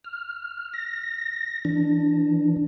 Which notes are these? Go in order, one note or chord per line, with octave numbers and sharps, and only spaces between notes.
F6
A#6
E3 D4